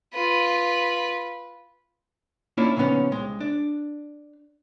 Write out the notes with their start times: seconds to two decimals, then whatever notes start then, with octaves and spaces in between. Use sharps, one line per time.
0.13 F4 B4
2.57 A#3 C#4 D4 E4 F4 E5
2.77 A#2 C#3 F3 B3 C#4 D#4
3.12 C2 G#3
3.40 D4